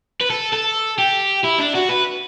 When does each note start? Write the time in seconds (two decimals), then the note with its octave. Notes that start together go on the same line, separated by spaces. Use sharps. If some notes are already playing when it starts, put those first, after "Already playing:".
0.21 B4
0.30 A4
0.53 A4
0.98 G4
1.44 E4
1.60 D4
1.75 F#4
1.89 B4